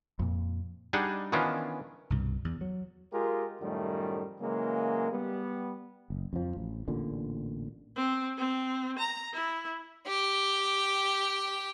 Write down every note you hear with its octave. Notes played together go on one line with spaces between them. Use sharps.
F2 A#2
G3 D4 D#4 G#4 D#5 F#5
D#3 E3 B3 C#4 D4 F4
C2 G2 B2
E2
F#3
G#3 F4 G4 G#4 A#4
F#2 A2 D#3 F3 G3 A3
C#3 E3 F#3 G#3 A#3
G3 B3
F#1
F2 F3
A1
A1 A#2 D3
C4
C4
A#5
E4
G4 G5